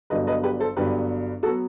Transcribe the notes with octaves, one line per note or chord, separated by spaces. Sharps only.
G1 G2 F#3 B3 B4 D#5
B4 D#5
G4 B4
A4 C5
G1 G2 F#3 B3 G4 B4
F#3 B3 F#4 A4